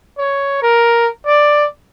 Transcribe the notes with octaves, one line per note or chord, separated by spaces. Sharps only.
C#5
A#4
D5